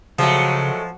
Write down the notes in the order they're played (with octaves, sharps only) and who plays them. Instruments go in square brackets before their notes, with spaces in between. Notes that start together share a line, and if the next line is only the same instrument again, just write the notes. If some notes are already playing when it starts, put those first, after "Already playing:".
[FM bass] C#3 [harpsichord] F3 [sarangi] F#3 [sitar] G#3 A3